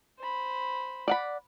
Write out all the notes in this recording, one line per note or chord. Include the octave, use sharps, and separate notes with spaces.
C5 B5
D5 F#5 B5